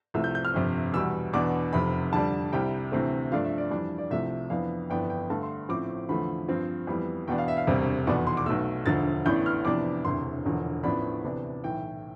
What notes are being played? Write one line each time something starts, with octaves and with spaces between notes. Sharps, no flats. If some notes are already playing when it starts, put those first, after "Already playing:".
C2 C3 F3 A3 E6
G6
G6
F6
G1 F2 C3
E2 B2 G3 E6
E2 B2 B3 D4 D6
F1 F2 C3 B5
F2 D3 G3 D4 A5
C2 C3 G3 G5
D2 C3 E3 A3 C4
G2 F3 A3 D4 F5
E5
D5
F2 E3 G3 D4
D5
C2 C3 F3 A3 E5
F2 E3 B3 D4 F5
G1 F2 E3 B3 D4 G5
G5
G2 D3 A3 A5
C6
A1 A2 F3 C4 D6
E2 D3 F3 A3 B5
G2 F3 C4
F2 E3 G3 B3
E2 B2 B3 D4 G5
F5
E5
F5
E1 D2 C3 G3 C4
F1 E2 B2 B3 D5
C6
D6
B1 B2 A3 E6
E1 D2 D3 F3 A6
A1 A2 E3 B3 D4 G6
F6
F2 C3 E3 B3 D4 D6
E1 D2 C3 E3 C6
E1 E2 D3 F3
A1 A2 F3 B3 D4 B5
D2 C3 E3 B3 D4
B1 A2 E3 G5